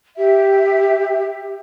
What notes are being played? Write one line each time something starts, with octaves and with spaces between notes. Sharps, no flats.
G4 E5